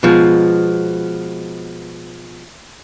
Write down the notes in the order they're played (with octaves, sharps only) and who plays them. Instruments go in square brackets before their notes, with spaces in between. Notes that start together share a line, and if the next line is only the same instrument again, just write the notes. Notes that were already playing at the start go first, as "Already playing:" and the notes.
[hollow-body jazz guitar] B2 F3 G#3